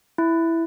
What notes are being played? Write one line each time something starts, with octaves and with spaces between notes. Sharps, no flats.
E4